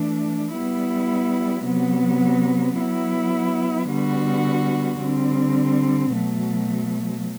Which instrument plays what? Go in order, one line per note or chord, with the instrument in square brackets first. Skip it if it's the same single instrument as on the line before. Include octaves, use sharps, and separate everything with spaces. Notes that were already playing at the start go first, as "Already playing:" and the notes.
Already playing: [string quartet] E3 A3 D4
G3 B3 E4
C3 F#3 B3
F#3 B3 E4
D3 G3 B3 F#4
D3 G3 C4
B2 F#3 A3